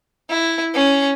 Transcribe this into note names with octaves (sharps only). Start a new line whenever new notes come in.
E4
C#4